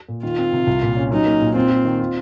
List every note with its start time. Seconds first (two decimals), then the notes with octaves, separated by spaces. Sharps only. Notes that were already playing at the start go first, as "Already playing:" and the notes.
0.09 A#2
0.23 D#3 F4
0.38 C4
0.53 C3
0.67 C2
0.83 A#2
0.97 C#4
1.11 F#3 D#4
1.26 A#3
1.41 A#2
1.55 C4 F4
1.70 F4
1.85 D#3
1.99 F4